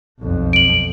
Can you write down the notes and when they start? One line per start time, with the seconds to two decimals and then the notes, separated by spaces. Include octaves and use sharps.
0.20 B1 F2
0.53 D7 F#7